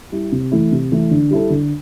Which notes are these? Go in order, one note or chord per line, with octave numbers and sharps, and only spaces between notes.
G3 E4
C3
E3 A3 E4
C3
E3 A3 E4
D3
G3 E4 A4
D3